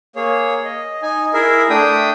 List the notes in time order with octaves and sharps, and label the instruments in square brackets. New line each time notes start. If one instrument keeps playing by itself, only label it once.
[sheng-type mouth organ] A#3 G#4 C#5
D#5
D#4 G#5
E4 G#4 A#4 E5
A3 D4 G5 D#6